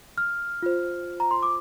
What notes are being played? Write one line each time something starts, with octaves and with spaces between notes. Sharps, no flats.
F6
F4 C5
A#5
C6
D6